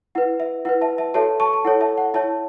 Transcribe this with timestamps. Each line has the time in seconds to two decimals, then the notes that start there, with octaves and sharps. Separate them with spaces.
0.15 E4 B4 F#5
0.40 E5
0.65 E4 B4 F#5
0.81 E5 A5
0.98 E5 A5
1.14 F#4 A4 C#5 E5 A5
1.40 A5 C#6
1.53 A5
1.65 E4 A4 C#5 F#5
1.81 E5 A5
1.98 F#5
2.14 E4 C#5 E5 A5